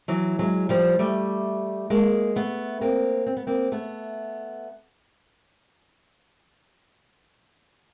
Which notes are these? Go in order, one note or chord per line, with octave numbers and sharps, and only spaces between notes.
E3 F#3
F#3 G#3
F3 G3
G3 A3
G#3 A#3
A3 B3
A#3 C4
C4
B3
A#3 C4
A3 B3